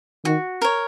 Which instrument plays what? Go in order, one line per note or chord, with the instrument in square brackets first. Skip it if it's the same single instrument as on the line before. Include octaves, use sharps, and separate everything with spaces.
[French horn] D#3 [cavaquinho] F#4
[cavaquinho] A#4 C#5